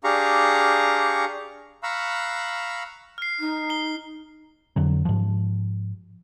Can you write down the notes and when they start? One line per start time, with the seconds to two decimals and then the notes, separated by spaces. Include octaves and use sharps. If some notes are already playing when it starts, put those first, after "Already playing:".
0.04 D4 G4 G#4 F5 A#5 C#6
1.83 F5 A#5 B5 C#6 E6 F#6
3.18 F6 C7
3.40 D#4
3.70 C7 G7
4.76 F2 D3 F#3
5.05 G#2 F3